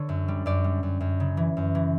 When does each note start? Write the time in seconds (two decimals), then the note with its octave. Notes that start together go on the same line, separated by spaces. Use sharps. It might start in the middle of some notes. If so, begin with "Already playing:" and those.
Already playing: D3 C#5
0.09 F#2
0.28 G3
0.46 F#2 D5
0.64 G3
0.83 F#2
1.00 F#2
1.20 C#3
1.37 E3
1.57 F#2
1.75 E3